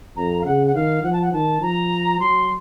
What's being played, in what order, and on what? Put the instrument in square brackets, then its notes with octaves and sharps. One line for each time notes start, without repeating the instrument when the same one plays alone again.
[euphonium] F2 [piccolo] A#5
[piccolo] F5
[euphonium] C#3 [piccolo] F#5
[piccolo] F#5
[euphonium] D#3 [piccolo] F5
[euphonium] F3 [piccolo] F#5
[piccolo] A5
F#5
[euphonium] D#3 [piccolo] A5
[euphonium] F3 [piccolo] A#5
[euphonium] F#3 [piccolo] C6